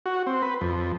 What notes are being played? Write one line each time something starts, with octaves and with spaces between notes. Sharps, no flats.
F#4
C4
B4
F2